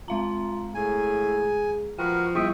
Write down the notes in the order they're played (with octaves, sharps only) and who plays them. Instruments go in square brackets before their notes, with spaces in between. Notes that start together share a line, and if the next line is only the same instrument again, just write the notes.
[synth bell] G#3 F5 A#5 [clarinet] F4
[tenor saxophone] A2 [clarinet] G#4 [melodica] G#5
[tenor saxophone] F3 [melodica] F#4 A#4 B4 [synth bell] G5
[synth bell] G3 E4 [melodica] E5 G5 C#6 [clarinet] D#6